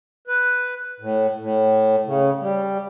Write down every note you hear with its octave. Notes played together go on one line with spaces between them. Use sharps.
B4
A2
A2
C#3
G3